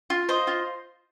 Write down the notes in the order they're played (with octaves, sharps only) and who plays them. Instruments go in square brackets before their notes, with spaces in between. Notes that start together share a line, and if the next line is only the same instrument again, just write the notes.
[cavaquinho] F4
C5 D#5
F4